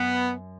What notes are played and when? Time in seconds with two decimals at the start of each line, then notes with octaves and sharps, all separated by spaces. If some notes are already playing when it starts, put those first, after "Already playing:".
Already playing: F#2 B3